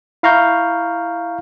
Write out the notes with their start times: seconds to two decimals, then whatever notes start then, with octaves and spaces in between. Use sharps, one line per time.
0.23 E4 F5 A#5 C#6 G6